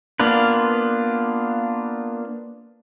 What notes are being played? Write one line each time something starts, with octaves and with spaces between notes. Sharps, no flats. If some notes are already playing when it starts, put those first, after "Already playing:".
A#3 B3 D4 F4 B4